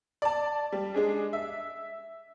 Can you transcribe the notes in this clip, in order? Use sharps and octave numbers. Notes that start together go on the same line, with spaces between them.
D5 A5
G3
G#3 D4 G#4
E5